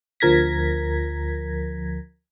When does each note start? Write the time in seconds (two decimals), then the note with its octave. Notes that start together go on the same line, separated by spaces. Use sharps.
0.20 D2 F3 A#4 G#6 A#6 B6